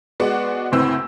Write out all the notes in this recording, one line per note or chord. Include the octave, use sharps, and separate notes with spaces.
G#3 B3 F#4 D5 F#5
F#1 D2 A2 C4 B4 E6